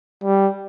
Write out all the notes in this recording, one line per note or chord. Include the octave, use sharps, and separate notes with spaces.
G3